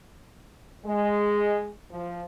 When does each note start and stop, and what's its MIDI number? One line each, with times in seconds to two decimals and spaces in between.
0.85 1.67 56
1.91 2.24 53